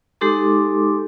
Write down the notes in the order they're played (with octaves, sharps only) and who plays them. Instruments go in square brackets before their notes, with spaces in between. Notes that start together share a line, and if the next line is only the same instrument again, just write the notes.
[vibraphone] G#3 D#4 G4 A4 C6 D6